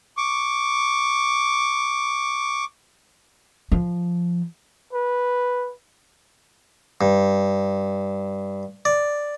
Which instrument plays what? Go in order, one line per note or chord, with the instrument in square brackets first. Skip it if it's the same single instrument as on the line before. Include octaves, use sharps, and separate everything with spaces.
[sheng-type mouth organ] C#6 D6
[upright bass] F3
[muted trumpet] B4
[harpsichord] G2
D5